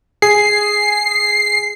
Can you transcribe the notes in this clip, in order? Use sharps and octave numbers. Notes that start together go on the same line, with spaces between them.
G#4 C7